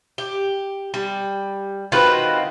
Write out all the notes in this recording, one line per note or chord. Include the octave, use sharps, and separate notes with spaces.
G4
G3
D#3 C4 F4 F#4 B4